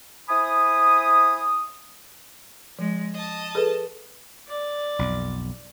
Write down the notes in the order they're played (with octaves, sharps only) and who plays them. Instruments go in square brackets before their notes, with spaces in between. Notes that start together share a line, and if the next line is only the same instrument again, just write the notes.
[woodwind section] E4 C5 G#5 B5 D#6
[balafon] F3 [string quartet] G#3
[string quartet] D#5 A5
[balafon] G#4 A4 B4
[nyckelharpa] D5
[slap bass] B1 F2